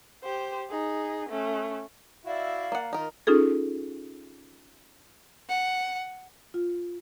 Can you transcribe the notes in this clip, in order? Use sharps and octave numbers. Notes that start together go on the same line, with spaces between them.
G4 C5
D#4 G#4
A3 C#4
E4 F#4 D5 E5 F5
A#3 F#5
D#3 D#4 F4 A#4
C#4 D#4 F4 G#4 A4
F#5
F4